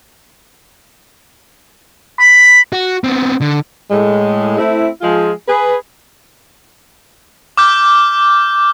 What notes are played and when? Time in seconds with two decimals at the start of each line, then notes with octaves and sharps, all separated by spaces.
2.19 B5
2.73 F#4
3.04 B3 C4
3.41 D3
3.89 A2 G#3
4.58 A3 C4 E4
5.01 F3 G#3 F4 G#4
5.46 G#4 B4
7.57 D6 F6 G6